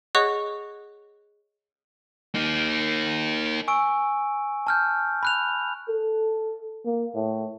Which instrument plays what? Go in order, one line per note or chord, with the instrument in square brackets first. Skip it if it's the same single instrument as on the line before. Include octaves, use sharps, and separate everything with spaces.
[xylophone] G#4 C#5 D#5 F#5 C#6 F#6
[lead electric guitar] A#3 D#4
[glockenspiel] G#5 C#6 E6 D7
A5 F6 G6
B5 F#6 F7
[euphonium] A4
A#3
A2